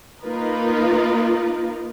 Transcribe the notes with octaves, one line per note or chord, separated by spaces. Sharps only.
A#3 D#4 F4 A#4 B4